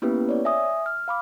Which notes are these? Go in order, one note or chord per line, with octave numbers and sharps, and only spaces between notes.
A#3 B3 C#4 E4 G4 B4
C#5 D5
E5 G#5 D#6
F6
F5 B5 D6